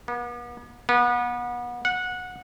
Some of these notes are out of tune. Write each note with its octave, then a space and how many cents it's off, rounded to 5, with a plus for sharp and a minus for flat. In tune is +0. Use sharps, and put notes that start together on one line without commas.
B3 -40
B3 -30
F#5 -20